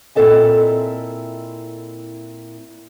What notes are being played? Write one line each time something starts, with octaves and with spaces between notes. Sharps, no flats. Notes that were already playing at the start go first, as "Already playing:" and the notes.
A#2 C4 E4 A4 D#5 G#5